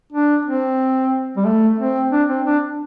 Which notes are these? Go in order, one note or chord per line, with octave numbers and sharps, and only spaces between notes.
D4
C4
G3
A3
C4
D4
C4
D4